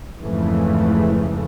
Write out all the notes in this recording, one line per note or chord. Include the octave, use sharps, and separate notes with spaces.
F2 G#2 C#3 E3 A3